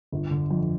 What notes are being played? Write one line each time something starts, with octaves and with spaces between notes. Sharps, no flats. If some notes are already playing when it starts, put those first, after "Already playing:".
G1
D3
F2